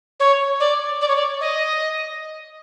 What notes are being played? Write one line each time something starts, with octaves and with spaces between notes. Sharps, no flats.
C#5
D5
D5
C#5
D5
D#5